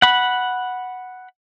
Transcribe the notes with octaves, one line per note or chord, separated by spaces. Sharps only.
F#5 B5